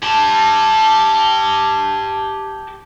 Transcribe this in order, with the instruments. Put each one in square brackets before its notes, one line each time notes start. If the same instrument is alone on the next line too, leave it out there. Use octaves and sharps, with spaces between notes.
[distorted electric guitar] G4 A5